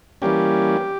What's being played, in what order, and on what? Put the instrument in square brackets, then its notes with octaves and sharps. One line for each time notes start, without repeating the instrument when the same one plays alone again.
[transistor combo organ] E3 G3 A#3 C#4 G4